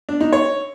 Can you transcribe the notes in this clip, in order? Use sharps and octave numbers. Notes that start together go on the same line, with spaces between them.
D4
D#4
C#5